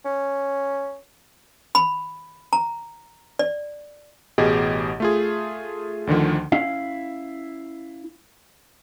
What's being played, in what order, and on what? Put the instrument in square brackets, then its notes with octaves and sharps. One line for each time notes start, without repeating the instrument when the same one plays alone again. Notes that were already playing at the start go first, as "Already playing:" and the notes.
[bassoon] C#4
[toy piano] B5
A#5
D5
[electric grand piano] A1 B2 G4 G#4 D#5
A3 F4 G#4
D2 D3 D#3 F3
[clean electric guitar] C#4 E4 F5